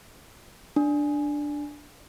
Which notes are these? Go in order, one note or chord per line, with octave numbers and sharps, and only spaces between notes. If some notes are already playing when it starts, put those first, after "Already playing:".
D4